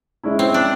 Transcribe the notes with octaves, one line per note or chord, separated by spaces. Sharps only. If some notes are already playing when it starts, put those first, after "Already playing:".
G#3 C#4 E4
C4
D4